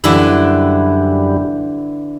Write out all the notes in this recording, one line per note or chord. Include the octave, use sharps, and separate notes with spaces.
F#2 D3 E3 G3 E4